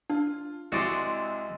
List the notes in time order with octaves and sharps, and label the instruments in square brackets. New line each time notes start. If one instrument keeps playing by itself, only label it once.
[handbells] D4 [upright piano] F4
[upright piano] C2 C3 [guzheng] G#3 [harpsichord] F#4 D5 C6